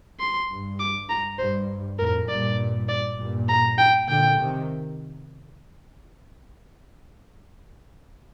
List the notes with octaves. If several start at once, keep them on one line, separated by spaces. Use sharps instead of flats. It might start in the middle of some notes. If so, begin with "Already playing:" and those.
C6
G2
D6
A#5
G2 C5
F2 A2 A#4
G2 A#2 D5
D5
G2 A#2
A#5
G5
A#2 D3 G5
C3 D#3